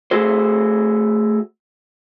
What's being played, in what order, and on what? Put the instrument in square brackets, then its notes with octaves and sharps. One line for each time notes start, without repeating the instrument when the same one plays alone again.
[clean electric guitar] A3 F#4 G#4 C5